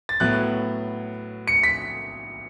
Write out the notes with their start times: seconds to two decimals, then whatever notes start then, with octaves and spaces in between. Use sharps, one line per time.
0.09 A6
0.20 A2 F#3 B3 F#6
1.48 C#7
1.63 B6